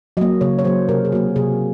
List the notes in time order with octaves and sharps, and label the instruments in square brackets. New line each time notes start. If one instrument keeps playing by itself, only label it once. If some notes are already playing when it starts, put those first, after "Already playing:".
[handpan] F#3 A#3 D#5
C#3 C#5
C#5
F#3 A#3 C5
C3 A#4
G#4
F#3 A#3 F#4
C3 G#4